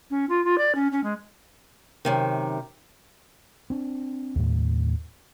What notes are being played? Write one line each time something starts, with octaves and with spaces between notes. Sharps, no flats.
C#4
F4
F4
D5
C#4
C#4
G#3
F#2 C3 D#3
C4 D4
D#2 A2